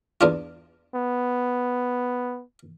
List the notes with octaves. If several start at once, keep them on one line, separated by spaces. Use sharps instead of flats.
E2 D4 F4
B3